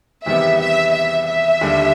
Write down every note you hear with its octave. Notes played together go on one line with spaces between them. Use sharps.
E2 C3 D#3 G3 B3 E5
E5
E5
E5
D#2 D3 G3